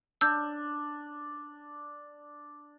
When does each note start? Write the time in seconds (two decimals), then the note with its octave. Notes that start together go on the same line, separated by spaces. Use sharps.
0.21 D4 E6 G6